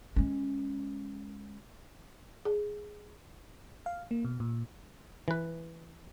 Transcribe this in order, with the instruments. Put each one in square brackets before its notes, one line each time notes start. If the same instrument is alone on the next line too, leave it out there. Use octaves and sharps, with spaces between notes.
[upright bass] G#3 C#4
[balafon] G#4
[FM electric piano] F5
A#3
B2
A#2
[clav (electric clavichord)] E3 B4